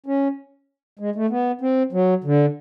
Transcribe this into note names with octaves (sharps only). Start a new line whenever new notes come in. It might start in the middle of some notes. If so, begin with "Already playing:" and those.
C#4
G#3
A3
B3
C4
F#3
D3